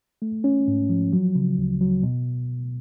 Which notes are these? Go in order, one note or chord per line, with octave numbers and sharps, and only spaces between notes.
A3
C#4
G#2
F3
F#3
C#3
D2
F#3
B2